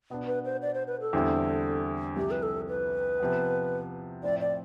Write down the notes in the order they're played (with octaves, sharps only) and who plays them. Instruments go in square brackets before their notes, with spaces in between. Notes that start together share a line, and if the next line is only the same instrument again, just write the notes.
[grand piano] B2 B3 D4
[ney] B4
C5
D5
C5
B4
A4
[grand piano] E2 D3 G3 C4 E4
[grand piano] C2 C3 F3 [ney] G4
[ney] B4
A4
B4
[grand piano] C3 F3 B3
[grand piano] A2 F3 C4 E4 [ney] D5
[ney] D5